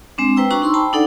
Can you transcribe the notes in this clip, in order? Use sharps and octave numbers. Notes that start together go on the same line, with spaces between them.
G#3 C4 D4
B4 C5 G5 A#5 E6
D4 F#4 A#5 C#6
D#4 C6 C#6 E6
C5 G5 A5 B5
D4 D#4 A4 D5 F#5